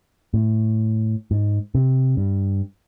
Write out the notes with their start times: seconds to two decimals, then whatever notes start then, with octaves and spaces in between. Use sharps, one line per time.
0.34 A2
1.31 G#2
1.75 C3
2.17 G2